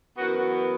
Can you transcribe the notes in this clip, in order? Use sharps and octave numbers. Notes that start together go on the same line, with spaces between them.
F#2 E3 B3 F#4